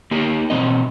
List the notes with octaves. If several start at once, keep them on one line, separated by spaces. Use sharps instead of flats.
A#3 D#4 G4
B2 E3 C4 D#5